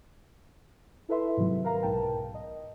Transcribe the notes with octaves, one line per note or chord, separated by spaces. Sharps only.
E4 A4 B4 E5 C6
G#2 C3 D#3 F#3
A#4 B4 F5 A#5
B1 G#2 A#4 G5 A5
D#5